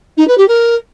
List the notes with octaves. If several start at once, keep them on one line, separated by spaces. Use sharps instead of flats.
D#4
B4
G4
A#4